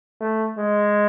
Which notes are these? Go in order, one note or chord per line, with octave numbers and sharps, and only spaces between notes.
A3
G#3